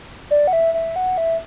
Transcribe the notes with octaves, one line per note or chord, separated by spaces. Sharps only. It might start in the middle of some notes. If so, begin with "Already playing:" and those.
D5
F#5
E5
E5
F#5
E5